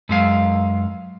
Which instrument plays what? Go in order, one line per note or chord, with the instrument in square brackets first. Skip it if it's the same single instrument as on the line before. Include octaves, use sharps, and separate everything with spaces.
[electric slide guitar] F#2 G#3 F5